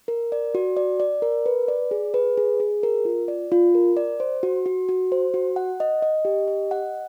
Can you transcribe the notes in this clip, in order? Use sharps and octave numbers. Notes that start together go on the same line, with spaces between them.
A#4
D5
F#4
D5
D5
A#4
B4
D5
G#4
B4
G#4
G#4
A#4
F4
D5
F4
A#4
D5
C5
F#4
F#4
F#4
C5
F#4
F#5
D#5
D#5
G4
D#5
F#5